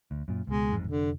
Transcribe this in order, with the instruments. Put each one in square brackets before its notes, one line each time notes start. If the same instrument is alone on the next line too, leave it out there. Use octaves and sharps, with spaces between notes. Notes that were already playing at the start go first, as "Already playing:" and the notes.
[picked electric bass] D2
F#2 A#2
[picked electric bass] C#2 B2 [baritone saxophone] G#3
[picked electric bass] A1 F2 G#2
[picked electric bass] F1 [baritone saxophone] D3